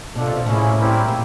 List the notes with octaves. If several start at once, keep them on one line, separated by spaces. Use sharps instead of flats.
B2 D4 F4 A4
C3
B2
A2 A#3 C#4 E4 G#4
G3 C4 E4 G4 A#4
A#2